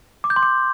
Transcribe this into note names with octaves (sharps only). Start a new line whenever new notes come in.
D6
G6
C6
D6